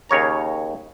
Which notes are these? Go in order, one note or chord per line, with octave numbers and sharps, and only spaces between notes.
D#2 C#3 C#5 A#5